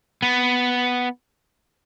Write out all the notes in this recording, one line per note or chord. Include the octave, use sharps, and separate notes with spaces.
B3